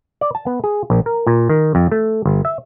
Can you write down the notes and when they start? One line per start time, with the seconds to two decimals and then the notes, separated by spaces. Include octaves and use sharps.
0.21 D5
0.35 A5
0.46 B3
0.64 G#4
0.90 A#1
1.06 A#4
1.27 A#2
1.49 D#3
1.75 F2
1.91 A3
2.25 G1
2.45 E5